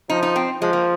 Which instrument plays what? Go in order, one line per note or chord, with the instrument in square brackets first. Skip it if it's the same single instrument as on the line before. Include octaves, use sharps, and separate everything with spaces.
[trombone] F3 [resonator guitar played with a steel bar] D#4
[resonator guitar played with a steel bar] D#4
C4
[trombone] F3 [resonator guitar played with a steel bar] G#3
[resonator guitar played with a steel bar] A#3